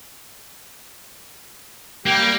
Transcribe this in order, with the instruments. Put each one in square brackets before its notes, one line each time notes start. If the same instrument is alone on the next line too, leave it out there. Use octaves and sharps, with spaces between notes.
[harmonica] G3 G4 [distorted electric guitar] A#3